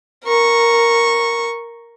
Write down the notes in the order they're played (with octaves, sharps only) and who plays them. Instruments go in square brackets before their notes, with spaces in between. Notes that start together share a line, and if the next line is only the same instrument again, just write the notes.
[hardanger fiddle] A#4 C#6